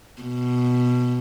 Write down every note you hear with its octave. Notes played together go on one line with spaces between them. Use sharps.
B2